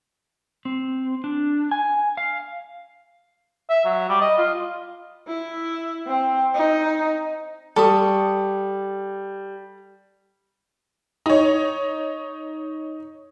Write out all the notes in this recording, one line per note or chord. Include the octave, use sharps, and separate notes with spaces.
C4
D4
G#5
F5
E5
F#3
G3
D#5
F4
E4
C4
D#4
G3 A4 C#6 D#6
D#4 C#5